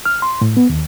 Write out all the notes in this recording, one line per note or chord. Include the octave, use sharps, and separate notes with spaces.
F6
C6
A2
B3
D#2